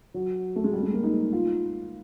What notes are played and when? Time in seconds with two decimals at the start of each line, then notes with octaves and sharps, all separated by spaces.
0.14 F#3
0.56 A3
0.64 G#3
0.73 G3
0.83 G#3
0.93 A#3
1.03 D#4
1.33 F4